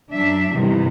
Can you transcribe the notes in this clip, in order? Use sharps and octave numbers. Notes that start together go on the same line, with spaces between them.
F#2 F#3 D4 E5
E2 G2 C3 D#3